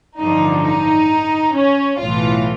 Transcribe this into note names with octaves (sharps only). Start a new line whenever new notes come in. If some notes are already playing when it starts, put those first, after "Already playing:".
A1 G2 D3 F3 D#4
D#4
C#4
B1 A2 E3 F4